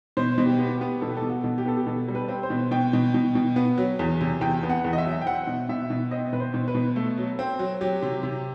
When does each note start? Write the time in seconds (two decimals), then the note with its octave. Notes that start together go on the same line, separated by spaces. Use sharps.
0.17 B2 C5
0.38 B2
0.46 G4
0.59 B3
0.74 G4
0.81 B3
1.01 B2 A4
1.09 G4
1.17 A4
1.22 B2
1.30 F#4
1.44 B2
1.58 G4
1.66 B3 A4
1.76 G4
1.87 B2 A4
2.09 G3
2.15 B4
2.29 C4
2.43 C5
2.50 B2
2.71 B2 G5
2.93 B2
3.14 B2
3.35 B2
3.56 B3
3.78 F#3
3.99 E2
4.21 C3
4.41 E2 G5
4.63 B3
4.70 F#5
4.84 E2
4.93 D#5
4.98 E5
5.05 F#3
5.21 G5
5.26 C4 F#5
5.47 B2
5.69 B2 E5
5.90 B2
6.11 C4 D#5
6.33 B2 B4
6.40 C5
6.54 B2
6.68 B4
6.75 B2
6.96 A3 A4
7.18 F#3
7.39 C4
7.59 F#3
7.81 F#3 G4
8.02 C3
8.23 C3